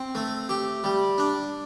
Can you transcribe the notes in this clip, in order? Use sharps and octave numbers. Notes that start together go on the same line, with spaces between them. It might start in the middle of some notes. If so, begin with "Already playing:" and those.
Already playing: C4
A3
G4
G3
D4